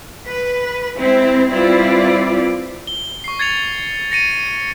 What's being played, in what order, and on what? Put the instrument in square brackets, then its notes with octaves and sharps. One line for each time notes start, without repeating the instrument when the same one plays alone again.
[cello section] B4
G#3 C4 E4
G3 C4 E4 F4 B4 D5
[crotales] G7
C#6 C7
G#6 A6 C#7 F7
A#6 C#7 D#7